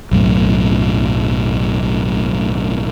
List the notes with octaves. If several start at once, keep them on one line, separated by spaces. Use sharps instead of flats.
B1 F#2 A2